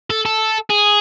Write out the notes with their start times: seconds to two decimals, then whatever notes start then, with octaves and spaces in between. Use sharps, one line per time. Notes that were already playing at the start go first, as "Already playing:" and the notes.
0.10 A4
0.26 A4
0.70 G#4